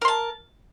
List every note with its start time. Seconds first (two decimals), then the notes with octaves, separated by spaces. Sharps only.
0.02 A#4
0.05 C6
0.08 A5